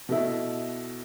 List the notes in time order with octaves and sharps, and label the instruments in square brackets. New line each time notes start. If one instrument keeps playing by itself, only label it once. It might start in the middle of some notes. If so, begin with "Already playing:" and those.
[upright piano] B2 A3 E4